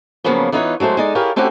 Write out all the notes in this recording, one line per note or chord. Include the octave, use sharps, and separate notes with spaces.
C#3 F3 F#3 A#3 B3 C#4
E3 B3 D#4 F4 C5 C#5
F#3 G#3 A3 C5
G#3 D#4 D5
E4 F4 G4 G#4 A#4 C#5
A3 C4 C#4 E4 F#4 G4